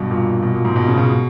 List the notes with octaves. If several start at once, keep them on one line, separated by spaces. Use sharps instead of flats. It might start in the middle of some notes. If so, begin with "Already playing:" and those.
Already playing: G2 B2
A#2
B2
A#2
G#2
B2
C#3
B2